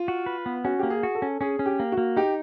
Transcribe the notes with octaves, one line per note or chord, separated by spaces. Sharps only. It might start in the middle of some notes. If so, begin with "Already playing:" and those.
Already playing: F4
F#4
B4
B3
C#4 F#4
A#3 G4
G#4
F#4
A4
C#4
C#4 G#4
C#4
G4
A#3
F#4
A#3
D#4 G4